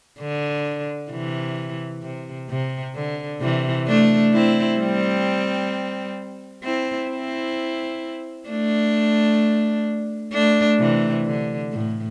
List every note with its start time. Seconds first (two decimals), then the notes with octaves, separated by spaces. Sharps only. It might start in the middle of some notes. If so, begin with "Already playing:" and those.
0.19 D3
1.11 C3 E3
2.03 C3
2.49 C3
2.96 D3
3.41 C3 E3
3.88 A3 D4
4.34 C4 E4
4.79 G3 C4
6.64 C4 E4
7.10 C4 E4
8.49 A3 D4
10.33 A3 D4
10.79 C3 E3
11.26 D3
11.72 A2